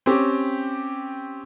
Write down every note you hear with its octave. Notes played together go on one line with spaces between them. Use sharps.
C4 C#4 G4